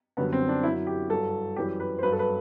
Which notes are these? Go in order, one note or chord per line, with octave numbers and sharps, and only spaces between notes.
F#2 D3 G3 B3
C4
D4
F#2 F#3 E4
G4
G2 F#3 A4
F#2 E3 G3 G4
B4
C5
G2 F#3 B4
A4
B4